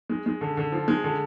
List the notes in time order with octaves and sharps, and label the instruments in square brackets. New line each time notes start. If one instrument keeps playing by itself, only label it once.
[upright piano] G#3
G#3
D3
D3
F3
G#3
D3